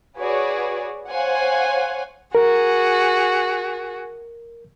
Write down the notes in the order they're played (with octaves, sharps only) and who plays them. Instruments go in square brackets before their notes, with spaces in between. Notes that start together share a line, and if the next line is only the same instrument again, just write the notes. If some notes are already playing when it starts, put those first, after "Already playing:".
[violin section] F#4 G#4 B4 C#5 D5
C5 C#5 F5 F#5 G#5
[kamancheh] F#4 G#4 [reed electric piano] A#4